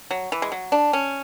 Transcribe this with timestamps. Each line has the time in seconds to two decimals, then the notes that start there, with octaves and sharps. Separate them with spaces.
0.11 F#3
0.32 E3
0.42 G#3
0.52 F#3
0.72 D4
0.93 C#4